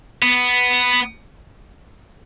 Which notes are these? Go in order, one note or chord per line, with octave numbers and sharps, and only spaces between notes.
B3